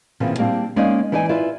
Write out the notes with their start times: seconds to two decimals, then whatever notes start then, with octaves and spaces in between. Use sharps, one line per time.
0.20 A#2 C#3 E3 B3 C4
0.38 G3 A#3 C4 D4
0.76 G#3 A#3 C#4 D#4 D5 D#5
1.12 E3 D#4 D5 D#5 G#5
1.29 E4 F4 B4 D5